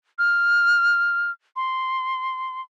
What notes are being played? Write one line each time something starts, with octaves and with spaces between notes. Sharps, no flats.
F6
C6